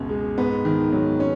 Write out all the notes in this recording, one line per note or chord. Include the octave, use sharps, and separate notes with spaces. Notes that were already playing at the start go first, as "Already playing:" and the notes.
Already playing: C#2 F#2 B2
G#3
G#2 B3
D#3
F#3
C#4